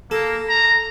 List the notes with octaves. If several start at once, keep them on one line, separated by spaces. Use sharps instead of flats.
A#3 A4
A#5